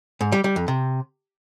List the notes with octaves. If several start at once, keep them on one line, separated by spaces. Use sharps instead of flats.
G#2
G3
G3
F2
C3